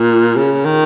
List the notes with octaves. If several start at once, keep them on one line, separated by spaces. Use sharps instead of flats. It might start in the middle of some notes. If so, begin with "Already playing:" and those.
Already playing: A#2
C#3
D#3